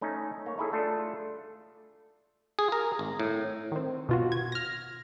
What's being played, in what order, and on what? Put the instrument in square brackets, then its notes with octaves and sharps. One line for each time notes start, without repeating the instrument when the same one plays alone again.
[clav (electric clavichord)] A3 C#4 D#4
A#3 C#5
D#4 E4 G#4 A4
A3 D4 F4 A4
G#4
A#4
G#1
A2
[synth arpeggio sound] D#3 C4
B2 F4 F#4
G#6
F6 A#6